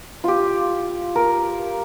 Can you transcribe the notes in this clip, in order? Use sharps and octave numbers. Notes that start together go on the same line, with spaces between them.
F4 G4
A#4